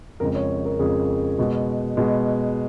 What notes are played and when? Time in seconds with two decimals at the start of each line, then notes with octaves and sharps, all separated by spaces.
0.20 F2 C#3 G#3 A#4
0.35 C#5
0.65 A#4
0.79 F2 C#3 G#3 G#4
1.38 B2 G#3
1.97 B2 G#3